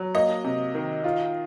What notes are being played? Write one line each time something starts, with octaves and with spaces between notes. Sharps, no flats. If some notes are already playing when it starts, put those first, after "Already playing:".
Already playing: F#3
A#3 D#5
C3
D#3
F4